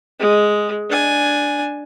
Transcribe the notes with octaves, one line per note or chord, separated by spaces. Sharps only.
G#3
D4 G#5